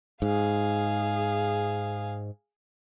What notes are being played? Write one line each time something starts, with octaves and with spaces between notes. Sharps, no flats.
G#2 G#4 F5